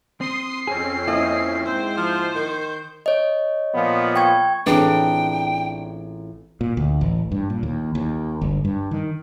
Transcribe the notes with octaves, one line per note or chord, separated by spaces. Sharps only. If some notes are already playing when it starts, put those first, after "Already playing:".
C4 C6 D#6 C7
F2 C4 C#4 G#4
A#3 E4 D#5
G#2 C4 C5
F3
D#3 G6
C#5 D#5
A#2 F3 B3
G5 C#6 G#6
A1 C4 D4 F4 G#4 B4 G5 A#5
A#2
D2
A1
G2
A#2
D#2
D#2
G1
G2
D#3